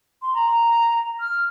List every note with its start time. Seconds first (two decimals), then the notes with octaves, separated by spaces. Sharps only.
0.22 C6
0.34 A#5
1.20 F6